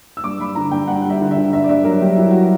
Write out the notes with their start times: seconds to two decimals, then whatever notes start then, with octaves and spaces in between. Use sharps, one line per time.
0.17 E6
0.24 G2 D6
0.39 G2 B5
0.55 D3 A#5
0.71 G2 G5
0.88 G2 F#5
1.02 G3 F#5
1.10 E5
1.21 D3
1.31 E5
1.37 D3
1.52 G2 E5
1.64 D5
1.69 G2 E5
1.84 F#3 A#4
2.01 G2 G4
2.17 F#3 E4
2.31 F#4